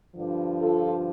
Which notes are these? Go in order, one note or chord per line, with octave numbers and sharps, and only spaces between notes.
G2 D3 F3
F4 A4